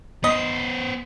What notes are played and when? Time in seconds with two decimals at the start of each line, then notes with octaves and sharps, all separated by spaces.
0.24 B3 C5 D#5